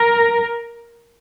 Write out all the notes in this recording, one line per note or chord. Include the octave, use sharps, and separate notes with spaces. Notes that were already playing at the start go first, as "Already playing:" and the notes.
Already playing: A#4